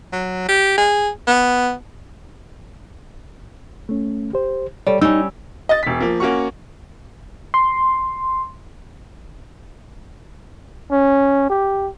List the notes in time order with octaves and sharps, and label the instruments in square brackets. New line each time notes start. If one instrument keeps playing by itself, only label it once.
[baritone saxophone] F#3
G4
G#4
B3
[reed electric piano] A3 C#4
G4 C5
[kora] G3 [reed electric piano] A4 C#5 D5
[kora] G3 C#4 [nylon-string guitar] D#4 [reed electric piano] E6
[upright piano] D#5 A6
E1 B6
F3 A#3
A#3 C#4 F#4 C#6
[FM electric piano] C6
[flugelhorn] C#4
G4